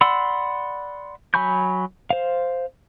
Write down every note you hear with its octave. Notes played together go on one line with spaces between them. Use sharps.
D5 F#5 B5 C6 E6
F#3 G#5 B5 C#6 G6
C5 F5